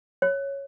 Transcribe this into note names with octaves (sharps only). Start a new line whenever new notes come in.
C#5